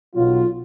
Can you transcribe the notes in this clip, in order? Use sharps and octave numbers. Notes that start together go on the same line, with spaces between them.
B1 B2 F#3 F4